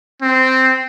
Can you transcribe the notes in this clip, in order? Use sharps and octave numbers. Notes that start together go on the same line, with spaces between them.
C4